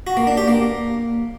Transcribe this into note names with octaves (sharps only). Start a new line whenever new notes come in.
F#4
A#3
D4
G4
A#3